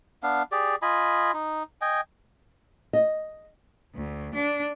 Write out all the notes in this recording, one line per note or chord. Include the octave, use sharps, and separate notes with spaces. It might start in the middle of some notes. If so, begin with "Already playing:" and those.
B3 D4 F5
G4 G#4 D5
F4 D#5 G#5 B5
D#4
D#5 G5 G#5
D#5
D2
D4